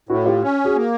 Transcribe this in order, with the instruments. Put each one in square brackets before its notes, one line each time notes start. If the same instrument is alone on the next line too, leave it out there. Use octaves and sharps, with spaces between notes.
[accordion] A2 [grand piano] E4 F#4
[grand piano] F4 G4
[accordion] C#4
[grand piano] F#4 G#4
[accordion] A#3